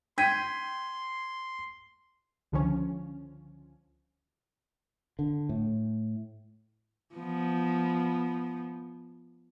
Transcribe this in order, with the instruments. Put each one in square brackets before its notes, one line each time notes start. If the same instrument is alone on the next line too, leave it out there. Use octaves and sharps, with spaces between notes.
[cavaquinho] G5 [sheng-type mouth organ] C6 [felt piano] G#6 B6 D#7
[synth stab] C#2 D3 F3 C#4
[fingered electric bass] D3
A2
[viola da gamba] F3 B3